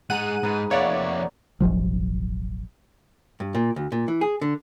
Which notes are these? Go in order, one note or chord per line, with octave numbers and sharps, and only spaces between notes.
G#2 G#4 F#5 A#5 F#6 D#7
G#2 D#4 B4
F2 A#3 C#5 D5 E5 F#5
E1 A1 F3 F#3
G2
A#2
D2
A#2
E3
G#4
D3